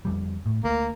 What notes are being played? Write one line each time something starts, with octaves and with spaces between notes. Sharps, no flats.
F2 D3 G3
A2
D2 A#3